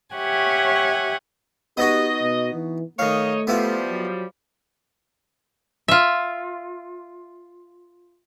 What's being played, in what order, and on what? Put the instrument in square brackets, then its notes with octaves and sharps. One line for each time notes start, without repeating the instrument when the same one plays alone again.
[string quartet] G4 C#5 E5 F#5 G#5 C#6
[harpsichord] B3 D#4 F#4 [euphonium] G4 [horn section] D#5
[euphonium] B2
E3
[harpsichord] D#3 F5 [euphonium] A3 [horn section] D#4 C#5 D#5
[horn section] F3 G3 [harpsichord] B3 E4 F4
[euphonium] F#3
[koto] F4 E5